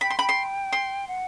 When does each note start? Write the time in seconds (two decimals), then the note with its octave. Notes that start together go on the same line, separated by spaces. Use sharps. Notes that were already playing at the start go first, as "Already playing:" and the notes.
0.01 G5 B5
0.10 C6
0.19 G5 B5
0.29 C6
0.73 C6
1.08 F#5